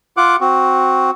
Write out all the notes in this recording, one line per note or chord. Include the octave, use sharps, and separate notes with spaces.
F4 F#5 D6
C4 F#4